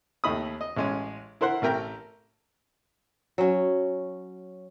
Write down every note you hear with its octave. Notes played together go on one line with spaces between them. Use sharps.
D#2 A3 D#4 B5 D#6
D#5
A1 G#3 C#4
E4 A#4 C5 F#5
A1 A3 A#4 G5 A#5
F#3 C#4